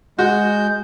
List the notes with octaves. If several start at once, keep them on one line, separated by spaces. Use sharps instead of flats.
G#3 F#4 G6